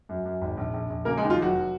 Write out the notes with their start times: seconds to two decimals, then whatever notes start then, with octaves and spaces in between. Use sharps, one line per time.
0.09 F#2
0.25 F#2
0.41 G#1
0.57 A#1
0.74 A#1
0.90 A#1
1.05 C#3 A#3 A#4
1.17 G#3 G#4
1.22 D#2 D#4
1.30 F3 F4
1.38 F1 F#3 F#4